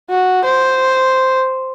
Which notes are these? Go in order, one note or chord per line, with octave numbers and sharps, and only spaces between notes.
F#4
C5